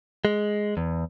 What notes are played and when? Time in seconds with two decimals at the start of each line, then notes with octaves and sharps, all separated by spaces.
0.25 G#3
0.77 E2